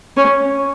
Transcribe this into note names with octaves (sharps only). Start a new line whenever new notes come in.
C#4